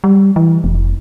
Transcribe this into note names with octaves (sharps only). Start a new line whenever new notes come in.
G3
E3
F1